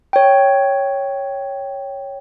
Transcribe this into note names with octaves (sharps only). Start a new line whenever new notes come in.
C#5 G5